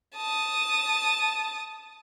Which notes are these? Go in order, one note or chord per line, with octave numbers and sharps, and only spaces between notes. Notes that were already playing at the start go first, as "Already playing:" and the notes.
A5 D#6